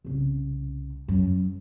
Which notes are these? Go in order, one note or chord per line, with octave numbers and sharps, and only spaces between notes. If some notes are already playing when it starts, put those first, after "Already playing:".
C2 C#3
F#2